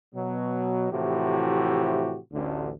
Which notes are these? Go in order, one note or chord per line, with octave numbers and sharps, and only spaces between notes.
B2 F#3
A2 C3 E3 F3 F#4 G4
A1 D2 D3